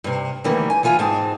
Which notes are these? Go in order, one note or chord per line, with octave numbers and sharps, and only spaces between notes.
G2 C3
D2 D#3 E3 G3 A#3
G#5
D2 E3 F4 G#5
G#2 G#3 C4 A5